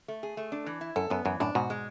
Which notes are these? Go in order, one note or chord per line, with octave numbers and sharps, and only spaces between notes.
A3
G#4
A3
D4
E3
E4
F#2 A4
F#2 B3
F#2 E3
F#2 A2 D4
G#2 B2 F#4
G#3